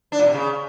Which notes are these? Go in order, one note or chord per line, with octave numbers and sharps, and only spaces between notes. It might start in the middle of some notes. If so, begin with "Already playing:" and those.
D4
A#2
C3
C#3